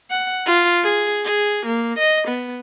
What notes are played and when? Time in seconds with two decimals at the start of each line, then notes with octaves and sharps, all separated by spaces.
0.10 F#5
0.46 F4
0.83 G#4
1.25 G#4
1.66 A#3
1.98 D#5
2.27 B3